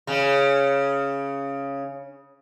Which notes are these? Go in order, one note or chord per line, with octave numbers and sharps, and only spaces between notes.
C#3 C#4